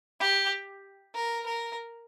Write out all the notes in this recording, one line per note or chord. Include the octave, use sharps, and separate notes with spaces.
G4
A#4
A#4